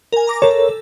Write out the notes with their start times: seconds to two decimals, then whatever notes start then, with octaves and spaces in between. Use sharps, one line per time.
0.12 A#4 G#5
0.27 A#5 D6 A#6
0.42 A4 A#4 C#5